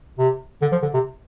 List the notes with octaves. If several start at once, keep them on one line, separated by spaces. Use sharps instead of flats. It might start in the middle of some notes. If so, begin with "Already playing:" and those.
C3
D3
F3
D3
C3